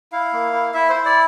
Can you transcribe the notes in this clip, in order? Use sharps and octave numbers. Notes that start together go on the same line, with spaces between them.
E4 F5
A#3
E4
E4 E5
C5
E4
D5